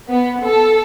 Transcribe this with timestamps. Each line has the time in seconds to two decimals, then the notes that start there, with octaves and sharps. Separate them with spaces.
0.10 B3
0.45 A4